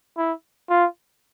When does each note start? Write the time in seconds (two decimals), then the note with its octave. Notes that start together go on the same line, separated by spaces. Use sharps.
0.17 E4
0.70 F4